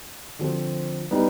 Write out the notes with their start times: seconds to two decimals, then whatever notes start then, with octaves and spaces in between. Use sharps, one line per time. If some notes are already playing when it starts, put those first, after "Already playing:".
0.39 D3 F3 C4
1.11 G3 B3 D#4